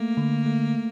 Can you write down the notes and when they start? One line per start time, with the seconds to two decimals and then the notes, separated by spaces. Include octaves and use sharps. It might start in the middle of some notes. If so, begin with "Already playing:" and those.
Already playing: A3 A#3
0.17 D3
0.46 A3